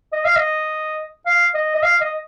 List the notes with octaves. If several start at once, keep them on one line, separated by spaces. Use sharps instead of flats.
D#5
F5
D#5
F5
D#5
D#5
F5
D#5